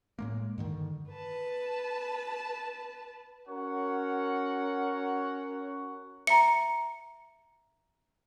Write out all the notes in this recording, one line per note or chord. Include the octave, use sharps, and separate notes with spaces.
A2 G#3 A#3
G2 D3 D#3
B4 A5
C#4 F#4 A#4 C#5 F#5
E5 A#5 C#7